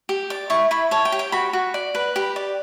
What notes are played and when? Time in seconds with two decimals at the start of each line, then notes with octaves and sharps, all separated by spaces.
0.09 G4
0.30 D5
0.50 E4 C#6
0.71 E4 B5
0.91 C#5 A5
1.05 G5
1.12 G4
1.19 G5
1.32 F#4 B5
1.53 F#4
1.74 D5
1.95 B4
2.16 G4
2.36 D5